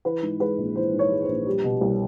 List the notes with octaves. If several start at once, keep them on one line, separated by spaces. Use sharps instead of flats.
E3 B4
G#2
G#3 B4
A#1
E3 C5
G#2
C#5
G#3
C5
A#1
G3
B2
C2